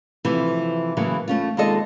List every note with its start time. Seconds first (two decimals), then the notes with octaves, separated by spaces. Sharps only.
0.25 C3 E3 F3 A3
0.97 A2 C#3 E3 F#3 A#3
1.28 A3 C#4 F4
1.57 D#2 C3 G#3 F4 A4 D#5